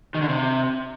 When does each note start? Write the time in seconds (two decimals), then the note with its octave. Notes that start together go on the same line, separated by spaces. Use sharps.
0.14 D#3
0.22 D3
0.29 C3